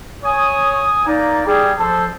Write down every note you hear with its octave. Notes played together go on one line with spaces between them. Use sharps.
C#5 G#5 D#6
A#3 D#4 D5
G3 G#4
F3 A4 C5